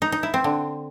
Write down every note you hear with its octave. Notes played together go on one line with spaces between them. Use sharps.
D#4
D#4
E4
C4
D3